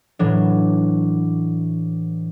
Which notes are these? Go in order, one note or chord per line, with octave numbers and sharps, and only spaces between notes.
A2 E3 F#3 D4